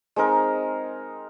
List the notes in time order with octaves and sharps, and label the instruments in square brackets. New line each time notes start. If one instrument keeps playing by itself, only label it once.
[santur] G#3 C4 D#4 A#4